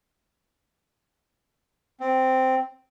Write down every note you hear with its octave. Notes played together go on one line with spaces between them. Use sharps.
C4